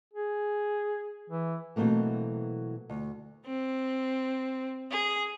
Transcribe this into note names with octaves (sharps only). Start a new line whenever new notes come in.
G#4
E3
B2 E3 F#3 A3 A#3 C4
D2
C4
G#4